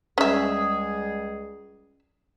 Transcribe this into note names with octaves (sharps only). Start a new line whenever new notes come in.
C#2 G3 C#4 G#4 E5